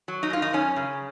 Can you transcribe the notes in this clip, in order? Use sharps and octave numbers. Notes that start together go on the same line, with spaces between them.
F#3
D#4
F#2 F4
D#4
F#2 C#4
C#3